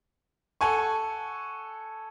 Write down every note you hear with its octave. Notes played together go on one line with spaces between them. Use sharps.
A4 F#5 G#5 C#6